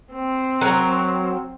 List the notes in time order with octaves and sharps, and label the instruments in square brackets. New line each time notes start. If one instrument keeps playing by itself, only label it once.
[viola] C4
[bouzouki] F#3 A#4